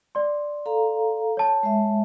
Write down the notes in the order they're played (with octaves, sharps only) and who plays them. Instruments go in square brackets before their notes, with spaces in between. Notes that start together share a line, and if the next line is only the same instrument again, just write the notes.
[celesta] D5 C6
[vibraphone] A4 F5 A#5
[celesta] C#5 A5
[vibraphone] G#3 E5